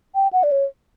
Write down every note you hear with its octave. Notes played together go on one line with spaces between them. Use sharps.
G5
F#5
D5
C#5